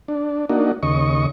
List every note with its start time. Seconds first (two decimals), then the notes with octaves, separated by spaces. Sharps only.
0.08 D4
0.49 A#3 D4 D#4 F#4
0.83 D#2 C#3 D#5 C#6